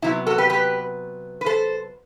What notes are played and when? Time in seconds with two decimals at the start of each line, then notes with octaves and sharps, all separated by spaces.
0.02 C3 F#3 B3 E4
0.27 F#4 A4
0.38 G4 B4
0.50 G4 B4
1.41 B4
1.46 A4 C5